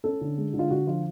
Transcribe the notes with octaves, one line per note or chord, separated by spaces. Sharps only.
C#4 A4
D3
G#3
D3
F4
D3 F#4
F3 F4